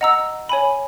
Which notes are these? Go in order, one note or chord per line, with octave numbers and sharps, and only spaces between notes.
D#5 F#5 A#5 E6
C#5 G#5 B5